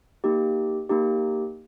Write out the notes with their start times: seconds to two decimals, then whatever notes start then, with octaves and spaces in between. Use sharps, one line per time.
0.24 A#3 D#4 G4
0.89 A#3 D#4 G4